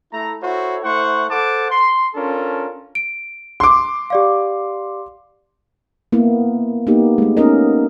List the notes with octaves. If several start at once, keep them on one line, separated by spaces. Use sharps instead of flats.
A3 E4 A4 A#5
E4 F#4 A4 C5 C#5
A3 E4 C5 F#5 C#6
A4 C5 F#5 A5 D6
C6
C#4 D4 F4 A4 A#4
D7
C6 D6
G4 D5 F5
A#3 B3 E4
A#3 B3 D#4 G4
G#3 A3
B3 C#4 D#4 A#4 D#5